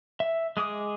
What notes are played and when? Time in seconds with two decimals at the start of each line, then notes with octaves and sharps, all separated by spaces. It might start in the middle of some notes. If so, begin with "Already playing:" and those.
0.20 E5
0.57 G#3 G#4 D6 D#6